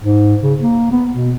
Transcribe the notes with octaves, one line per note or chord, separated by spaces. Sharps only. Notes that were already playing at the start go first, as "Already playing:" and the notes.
G#2
C#3
A#3
B3
B2